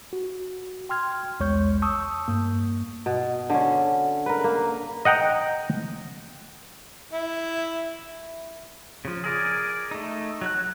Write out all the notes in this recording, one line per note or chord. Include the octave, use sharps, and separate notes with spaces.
F#4
G5 C6 F6 G#6
B1 E2 G#3 C#5 C#6 G6
A5 C#6 D#6 E6 G6
G2 A#3
B2
D3 C#4
A#4 B4
A#3
D#5 F#5 G5 A#5
E4
C#3 F3
G#4 A#4 D5
A3 D#4
F#3 F#4 F#6